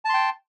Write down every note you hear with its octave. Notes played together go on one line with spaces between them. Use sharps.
G5 A5 C6